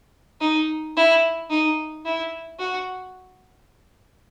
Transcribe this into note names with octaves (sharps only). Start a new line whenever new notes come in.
D#4
E4
D#4
E4
F#4